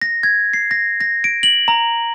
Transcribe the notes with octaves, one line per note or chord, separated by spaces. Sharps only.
A#6
G#6
C7
A#6
A#6
D7
F#7
A#5